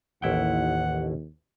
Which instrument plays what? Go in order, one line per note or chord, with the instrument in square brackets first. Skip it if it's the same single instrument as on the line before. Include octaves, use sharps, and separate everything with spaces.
[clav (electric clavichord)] A1 E4 G5 [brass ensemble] D#2 [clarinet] F#5